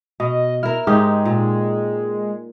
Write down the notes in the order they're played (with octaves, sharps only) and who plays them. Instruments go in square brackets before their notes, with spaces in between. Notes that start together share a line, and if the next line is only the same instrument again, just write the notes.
[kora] B2 [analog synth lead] D#5
[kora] E4 A#4 [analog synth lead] F6
[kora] G#2 D#4 G4 [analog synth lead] G#3
[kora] A#2